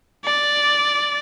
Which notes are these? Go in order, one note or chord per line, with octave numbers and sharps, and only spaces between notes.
D5